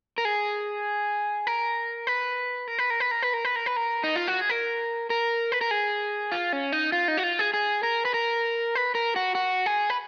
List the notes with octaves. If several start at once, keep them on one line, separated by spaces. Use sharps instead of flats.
A#4
G#4
A#4
B4
A#4
B4
A#4
B4
A#4
B4
A#4
B4
A#4
B4
A#4
D#4
F4
F#4
G#4
A#4
A#4
B4
A#4
G#4
F4
C#4
D#4
F4
D#4
F#4
F4
G#4
G#4
A#4
B4
A#4
B4
A#4
F#4
F#4
G#4
B4